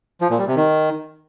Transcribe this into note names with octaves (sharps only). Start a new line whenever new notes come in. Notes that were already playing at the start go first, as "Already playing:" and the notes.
F3
A#2
G3
C3
D#3